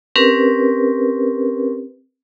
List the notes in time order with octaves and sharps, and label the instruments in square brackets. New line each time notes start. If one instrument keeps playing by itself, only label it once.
[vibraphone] C4 C#4 G4 A#4 B4